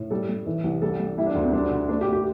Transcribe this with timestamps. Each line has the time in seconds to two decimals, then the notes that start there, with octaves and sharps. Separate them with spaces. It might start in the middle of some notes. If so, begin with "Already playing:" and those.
Already playing: A2
0.10 G3 A4
0.29 G3
0.46 E3
0.64 C2
0.82 G3 A4
0.99 G3
1.18 G3 E4
1.26 D4
1.35 D2
1.44 C4
1.53 G3 D4
1.71 D3
1.89 A3 D4
2.01 G4
2.07 A3
2.13 G4